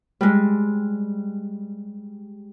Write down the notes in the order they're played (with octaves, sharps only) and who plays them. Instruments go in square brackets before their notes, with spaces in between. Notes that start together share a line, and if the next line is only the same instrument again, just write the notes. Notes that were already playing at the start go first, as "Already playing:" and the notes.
[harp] G3 G#3